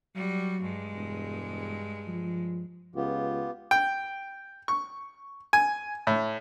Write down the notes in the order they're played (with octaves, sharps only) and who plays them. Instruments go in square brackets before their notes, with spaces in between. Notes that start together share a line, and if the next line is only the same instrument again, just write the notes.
[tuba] F#3 [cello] G3 F#4
[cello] G2 G#3
[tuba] E1
F3
[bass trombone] C#2 [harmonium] B3 F4 G4
[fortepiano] G5
C#6
G#5
A2